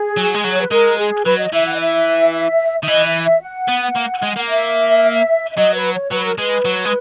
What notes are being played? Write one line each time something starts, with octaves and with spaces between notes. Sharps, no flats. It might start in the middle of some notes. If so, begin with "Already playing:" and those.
Already playing: G#4
F#3
G#3
F#3
C#5
B4
G#3 A#4
G#4
F#3 B4
D#5
E3 E5
F#5
D#5
E5
D#3 E5
E3 D#5
E5
E5
F#5
B3
A#3
G#3
A#3
E5
E5
F#3 D#5
B4
C#5
F#3 B4
A#4
G#3 B4
F#3
G#3